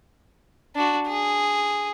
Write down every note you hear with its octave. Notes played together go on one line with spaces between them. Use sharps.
D4 F#4
G#4